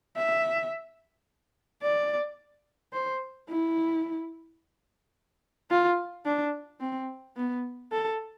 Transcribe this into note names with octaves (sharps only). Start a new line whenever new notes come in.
E5
D5
C5
E4
F4
D4
C4
B3
A4